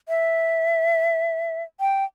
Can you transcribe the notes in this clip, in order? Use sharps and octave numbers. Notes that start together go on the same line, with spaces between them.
E5
G5